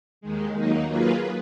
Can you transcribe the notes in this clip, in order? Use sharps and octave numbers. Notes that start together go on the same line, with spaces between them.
D#2 D#3 G#3
D#2 D#3 F#3 A#3 D#4
F#3 A#3 F4 G#4 B4